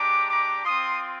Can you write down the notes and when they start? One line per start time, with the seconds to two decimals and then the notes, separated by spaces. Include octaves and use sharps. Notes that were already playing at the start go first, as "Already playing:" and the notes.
Already playing: G#3 D4 G4 A#5 D6
0.30 A#5 D6
0.65 C4 F4 C6 D#6